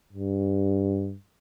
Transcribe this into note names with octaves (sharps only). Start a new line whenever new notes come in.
G2